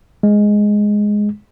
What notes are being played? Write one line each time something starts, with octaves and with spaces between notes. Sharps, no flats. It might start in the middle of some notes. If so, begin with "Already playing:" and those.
G#3